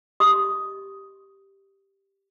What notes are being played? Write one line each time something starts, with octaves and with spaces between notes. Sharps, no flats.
G4 D#5 C6 C#6 D#6